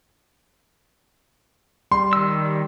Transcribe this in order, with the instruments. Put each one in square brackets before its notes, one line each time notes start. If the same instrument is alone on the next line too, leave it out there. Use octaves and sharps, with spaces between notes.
[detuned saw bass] G3 [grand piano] C6
[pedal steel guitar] D#3 E6